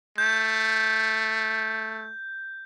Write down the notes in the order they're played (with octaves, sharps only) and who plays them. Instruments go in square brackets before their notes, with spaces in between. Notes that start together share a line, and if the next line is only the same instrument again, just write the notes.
[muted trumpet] A3 [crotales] G6